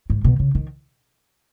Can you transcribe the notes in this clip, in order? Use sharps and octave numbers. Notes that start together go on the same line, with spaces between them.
G#2
B2
C#3
D#3